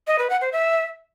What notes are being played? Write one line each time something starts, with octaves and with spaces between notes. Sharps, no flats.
D#5
B4
F#5
C5
E5